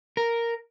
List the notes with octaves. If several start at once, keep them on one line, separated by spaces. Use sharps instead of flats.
A#4